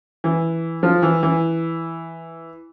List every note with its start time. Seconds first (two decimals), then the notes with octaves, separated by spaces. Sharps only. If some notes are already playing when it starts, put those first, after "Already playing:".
0.24 E3
0.83 F3
1.02 E3
1.23 E3